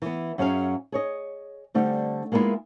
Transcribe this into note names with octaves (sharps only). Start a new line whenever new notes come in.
E3 B3
F#2 F#3 C#4 G#4 E5 F5
G#4 C#5 D#5
D3 G3 A3 C4
G#3 A#3 B3 D4 E4 F4